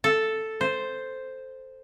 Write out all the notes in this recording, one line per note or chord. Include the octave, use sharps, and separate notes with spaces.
A4
C5